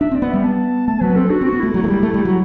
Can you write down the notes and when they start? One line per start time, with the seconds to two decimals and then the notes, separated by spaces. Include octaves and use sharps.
0.01 D4 E5
0.11 C4 D5
0.22 B3
0.29 G3 E5
0.44 B3 A5
0.87 A3 A5
1.01 F#3 B4
1.09 B3
1.16 C4 A4
1.30 D4 F#4
1.41 C4 F#4
1.53 B3
1.59 A3 E4
1.74 F#3
1.84 A3
1.88 G3
2.03 A3
2.14 G3
2.25 F#3